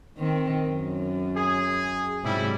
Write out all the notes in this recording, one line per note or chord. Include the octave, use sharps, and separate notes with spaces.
D#3 C4
F#2
G#4
G#2 C3 F#3 G3 E4